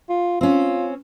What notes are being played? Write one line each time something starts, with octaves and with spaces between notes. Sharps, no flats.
F4
C4 C#4 F4